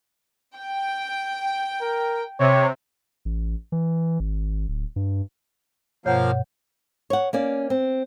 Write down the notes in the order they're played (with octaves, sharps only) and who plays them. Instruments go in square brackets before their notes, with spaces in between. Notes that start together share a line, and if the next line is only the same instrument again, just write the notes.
[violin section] G5
[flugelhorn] A#4
[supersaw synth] C3 [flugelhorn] C#5
[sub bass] A1
E3
G#1
D1
G2
[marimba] G2 B2 G6 [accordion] F3 A#3 F5 [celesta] C#5 F#5
[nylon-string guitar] C#5 F#5
A#3 C#4 D5
C4